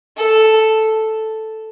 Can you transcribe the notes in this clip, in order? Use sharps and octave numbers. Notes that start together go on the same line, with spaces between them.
A4